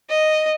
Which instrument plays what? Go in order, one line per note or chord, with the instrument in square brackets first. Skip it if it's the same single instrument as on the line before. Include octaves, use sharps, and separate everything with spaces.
[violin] D#5